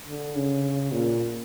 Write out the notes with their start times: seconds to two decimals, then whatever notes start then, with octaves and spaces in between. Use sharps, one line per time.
0.08 D3
0.36 C#3
0.92 A#2